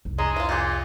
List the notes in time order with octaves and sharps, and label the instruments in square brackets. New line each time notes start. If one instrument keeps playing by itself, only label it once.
[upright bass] C2 F2
[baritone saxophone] G#3 [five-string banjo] D#4
[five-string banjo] E4 F4
[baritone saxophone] A#2 [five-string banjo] G4 G#4